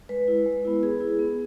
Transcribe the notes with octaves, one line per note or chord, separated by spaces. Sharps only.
G#3 B4
E4
G#3
B3 E4
B3 G#4
E4
B3